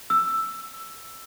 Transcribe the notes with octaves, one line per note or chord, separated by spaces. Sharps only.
E6